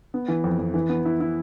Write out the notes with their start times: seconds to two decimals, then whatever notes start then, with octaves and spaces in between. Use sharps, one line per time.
0.14 B3
0.28 E3
0.44 F2
0.59 F2
0.74 E3
0.89 B3
1.05 E4
1.20 E4